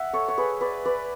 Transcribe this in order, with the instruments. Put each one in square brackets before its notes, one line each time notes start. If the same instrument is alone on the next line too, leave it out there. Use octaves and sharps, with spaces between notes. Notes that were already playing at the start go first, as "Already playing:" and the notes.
Already playing: [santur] E5 F#5
A4 C#5
C#5
G#4 B4
B4 D5
B4 D5